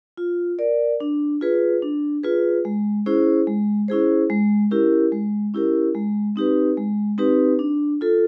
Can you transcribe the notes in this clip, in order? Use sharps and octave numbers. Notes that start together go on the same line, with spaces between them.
F4
A#4 D5
D4
F4 G#4 B4
D4
F4 G#4 B4
G#3
C#4 E4 G#4 C5
G#3
C#4 E4 G#4 C5
G#3
C#4 E4 G4 A#4
G#3
C#4 E4 G4 A#4
G#3
C4 D#4 G4 B4
G#3
C4 D#4 G4 B4
D4
F4 A4